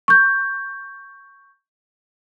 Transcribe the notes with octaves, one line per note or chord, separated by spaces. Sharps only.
C#6 G6